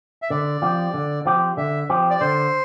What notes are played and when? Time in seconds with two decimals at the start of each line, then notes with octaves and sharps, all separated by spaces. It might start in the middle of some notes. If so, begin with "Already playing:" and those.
0.22 E5
0.30 D3 D5
0.62 F3 C4 G4
0.94 D3
1.25 F3 C4 G4
1.57 D3 E5
1.90 F3 C4 G4
2.10 D5
2.21 D3 C5